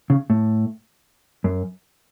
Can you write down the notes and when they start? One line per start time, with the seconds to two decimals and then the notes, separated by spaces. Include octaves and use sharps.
0.10 C#3
0.30 A2
1.44 F#2